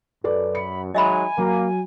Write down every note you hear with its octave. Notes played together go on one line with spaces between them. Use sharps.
F#2 A4 B4 D5
B5 C#7
F#3 G#3 D#4 D#5 E5 G#5 B5
F#3 A#3